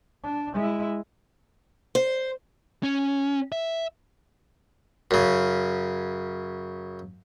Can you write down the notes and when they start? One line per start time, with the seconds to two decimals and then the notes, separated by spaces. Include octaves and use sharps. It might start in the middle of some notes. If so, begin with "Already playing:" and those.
0.24 D4
0.54 G#3 E4
1.95 C5
2.83 C#4
3.52 E5
5.11 F#2 C#3